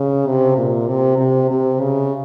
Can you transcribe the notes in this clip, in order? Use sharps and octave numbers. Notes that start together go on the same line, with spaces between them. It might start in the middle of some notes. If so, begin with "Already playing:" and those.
Already playing: C#3
C3
A#2
C3
C3
C3
C#3